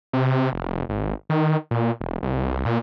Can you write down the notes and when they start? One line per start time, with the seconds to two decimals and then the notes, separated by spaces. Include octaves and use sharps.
0.13 C3
0.53 F1
0.89 G#1
1.30 D#3
1.71 A#2
2.01 E1
2.23 C2
2.66 A#2